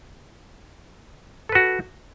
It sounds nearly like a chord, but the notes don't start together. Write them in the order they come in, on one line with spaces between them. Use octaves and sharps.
A4 B4 F#4